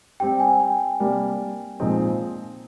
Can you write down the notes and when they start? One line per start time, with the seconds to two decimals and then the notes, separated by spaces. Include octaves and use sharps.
0.20 G3 C4 G4 G5
0.40 G#5
0.60 G5
0.80 G5
1.00 C3 G3 A#3 D4
1.80 A#2 F3 G#3 C4 D#4